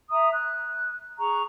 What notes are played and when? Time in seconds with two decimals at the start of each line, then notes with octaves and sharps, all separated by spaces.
0.09 E5 A#5 D#6
0.32 F#6
1.17 G#4 A#5 C#6